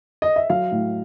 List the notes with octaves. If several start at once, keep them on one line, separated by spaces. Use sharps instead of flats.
D#5
E5
F#3 F5
A2